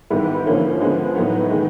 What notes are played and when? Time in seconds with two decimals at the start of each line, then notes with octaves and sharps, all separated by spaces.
0.10 G#2 D#3 G3 B3 E4
0.46 D3 F3 A#3 C#4 E4
0.81 D3 F3 G#3 B3
1.15 A2 F#3 B3 D#4
1.50 D#3 G#3 B3